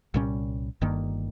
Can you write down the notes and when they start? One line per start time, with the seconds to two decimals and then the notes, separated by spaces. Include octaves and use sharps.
0.14 C2 A#2 G3 C#4
0.81 G1 G2 D#3 A#3